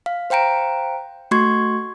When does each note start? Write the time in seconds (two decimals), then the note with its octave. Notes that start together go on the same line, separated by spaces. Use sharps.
0.06 F5
0.30 C5 F5 G5 A#5 D7
1.31 A3 F#4 C6 C#6 G#6